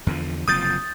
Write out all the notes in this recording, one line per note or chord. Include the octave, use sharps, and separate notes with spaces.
E2 D3 F3
F#1 C3 F3 D#6 G6 A6